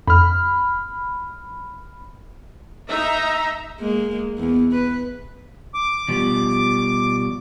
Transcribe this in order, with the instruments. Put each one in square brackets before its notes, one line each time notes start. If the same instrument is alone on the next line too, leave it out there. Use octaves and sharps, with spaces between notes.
[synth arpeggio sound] F2 [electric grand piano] B5 F6
[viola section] D#4 E5 A#5
[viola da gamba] G#3 A#3
E2
B4
[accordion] D6
[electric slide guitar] B2 F3 G3